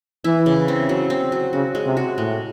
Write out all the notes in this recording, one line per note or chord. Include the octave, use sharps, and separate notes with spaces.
E3 E4
C#3
C4
F#3
C4
F#3
C#3 F#4
G#3
C3
F#4
A2 G#3